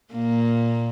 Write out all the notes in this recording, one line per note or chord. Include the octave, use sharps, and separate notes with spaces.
A#2 A#3